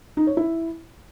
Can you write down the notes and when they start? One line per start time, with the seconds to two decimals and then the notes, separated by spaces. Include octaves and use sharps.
0.17 D#4
0.27 C#5
0.37 E4